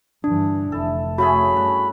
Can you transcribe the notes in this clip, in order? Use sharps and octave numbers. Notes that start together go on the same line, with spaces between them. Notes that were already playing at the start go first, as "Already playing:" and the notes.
G2 D3 E3 D4
F1 E4 A4
C#3 A3 F#4 G#4 B5
G2 D4